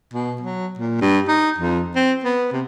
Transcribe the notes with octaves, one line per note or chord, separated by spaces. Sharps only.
B2
F#3
A#2
G2
D#4
F2
C4
B3
C3